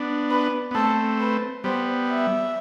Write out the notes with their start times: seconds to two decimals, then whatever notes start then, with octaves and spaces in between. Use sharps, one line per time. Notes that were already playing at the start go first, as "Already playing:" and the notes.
Already playing: B3 D4
0.31 B4
0.71 B3
0.75 A3 C4 A4
1.20 B4
1.64 G3 B3 C5
2.09 E5